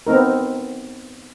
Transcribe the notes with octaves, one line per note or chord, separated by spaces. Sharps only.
B3 C4 D#4 A#4